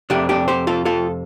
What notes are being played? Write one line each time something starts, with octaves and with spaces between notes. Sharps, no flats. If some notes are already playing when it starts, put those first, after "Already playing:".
F2 C3 A3 D4 G4
D4 G4
G4 C5
F4 A4
F4 A4